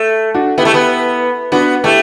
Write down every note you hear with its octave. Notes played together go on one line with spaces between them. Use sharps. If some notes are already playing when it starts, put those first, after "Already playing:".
Already playing: A3
D4 F#4
B3 E4 G4
A3
B3
B3 D4 F#4
A3 E4 G4